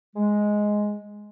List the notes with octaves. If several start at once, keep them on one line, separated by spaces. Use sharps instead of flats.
G#3